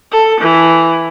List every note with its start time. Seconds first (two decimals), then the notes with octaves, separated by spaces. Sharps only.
0.11 A4
0.40 E3